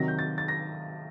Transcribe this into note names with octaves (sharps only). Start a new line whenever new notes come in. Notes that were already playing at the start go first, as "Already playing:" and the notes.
Already playing: C3 D#3 F#3 A#6
G6
A6
A6
A#6